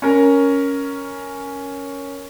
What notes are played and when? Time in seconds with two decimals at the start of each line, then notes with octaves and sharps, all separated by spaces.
0.02 C#4 A#4